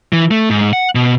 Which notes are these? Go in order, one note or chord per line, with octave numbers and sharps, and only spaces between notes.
E3
A3
G#2
F#5
B2